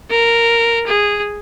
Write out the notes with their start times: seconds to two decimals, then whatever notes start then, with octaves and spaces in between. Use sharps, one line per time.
0.11 A#4
0.87 G#4